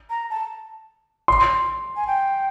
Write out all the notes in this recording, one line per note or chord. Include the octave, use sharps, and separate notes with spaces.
A#5
A5
C6
G#5
G5